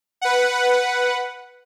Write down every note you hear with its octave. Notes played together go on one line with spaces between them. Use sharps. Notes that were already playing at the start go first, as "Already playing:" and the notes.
B4 F#5